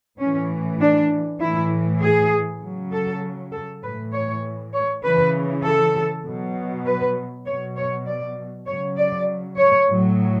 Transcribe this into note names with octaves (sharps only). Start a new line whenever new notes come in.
A2 E3 C#4
D4
A2 E3 E4
G#4
C#3 F#3
A4
A4
A2 E3 B4
C#5
C#5
C#3 E3 B4
A4
B2 F#3
B4
B2 F#3 C#5
C#5
D5
C#3 F#3 C#5
D5
C#5
A2 F#3